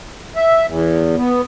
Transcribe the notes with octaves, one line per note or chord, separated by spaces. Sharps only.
E5
E2
B3